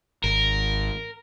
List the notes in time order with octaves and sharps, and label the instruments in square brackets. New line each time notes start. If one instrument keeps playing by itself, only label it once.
[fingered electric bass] G#1 [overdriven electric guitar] A#4